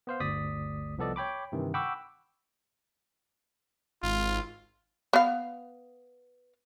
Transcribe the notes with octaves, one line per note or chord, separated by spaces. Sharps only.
B3 C5 F5
G1 D2 D5 D#6 B6
C2 F3 B3 A4 D5 D#5
C#5 G5 B5 D6
G2 C3 D#3 E3
F#5 G5 B5 C#6 D6 E6
G#1 F4
B3 F5